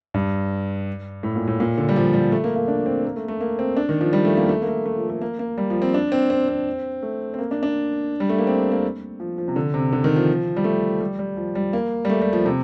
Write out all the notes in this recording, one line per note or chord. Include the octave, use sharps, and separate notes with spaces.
G2
A2
A#2
A2
A#2
D3
G3
F3
G3
A3
A#3
A#3
D4
C4
A#3
A3
A3
A#3
C4
D4
D#3
F3
G3
A3
A#3
A3
A#3
A3
A3
F3
A3
A#3
A#3
G3
F3
C4
D4
C4
C4
C4
A3
C4
A#3
D4
D4
G3
A3
A#3
C4
A#3
F3
F3
C3
D3
C3
D3
D#3
F3
G3
A3
G3
G3
F3
G3
A#3
G3
A3
G3
F3
C3